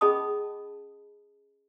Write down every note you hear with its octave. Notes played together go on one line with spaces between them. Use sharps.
C#4 G#4 D#5 A5 B5 D#6